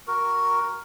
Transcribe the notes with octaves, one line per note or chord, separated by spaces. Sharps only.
F#4 A#4